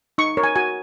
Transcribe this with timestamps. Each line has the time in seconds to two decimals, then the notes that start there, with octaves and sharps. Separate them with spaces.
0.18 D#4 C#6
0.37 A#4 C#5
0.44 G#5
0.56 F#4 G#5